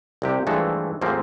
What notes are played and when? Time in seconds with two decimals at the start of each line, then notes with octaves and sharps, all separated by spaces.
0.22 C2 C3 G4
0.47 G2 E3 F3 G#3 A3 A4
1.01 D#2 G#2 F3 A3 A#3 C4